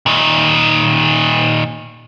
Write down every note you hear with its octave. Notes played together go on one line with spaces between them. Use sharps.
A#2 D#3